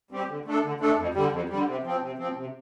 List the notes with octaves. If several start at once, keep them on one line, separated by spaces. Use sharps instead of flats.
G3 C4 G4
D3
A3 D4 A4
D3
A3 D4 A4
F2
D3 G3
F2
D3 G3
C3
F3 C4
C3
F3 C4
C3